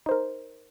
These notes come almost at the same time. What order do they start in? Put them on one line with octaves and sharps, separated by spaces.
D#4 C5 A#4